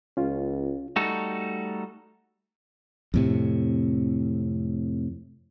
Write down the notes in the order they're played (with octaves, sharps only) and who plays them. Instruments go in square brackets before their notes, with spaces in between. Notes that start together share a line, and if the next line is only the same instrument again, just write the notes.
[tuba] C#2 [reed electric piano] C#4 F4
[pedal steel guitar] G3 A3 D#4 F#4 A4
[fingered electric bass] F2 A2 C3